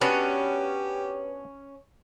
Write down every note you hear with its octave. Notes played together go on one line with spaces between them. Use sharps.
B3 C#4 D4 F#4 G4 B4